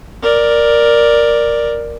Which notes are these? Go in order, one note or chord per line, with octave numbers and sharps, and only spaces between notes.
A#4 D5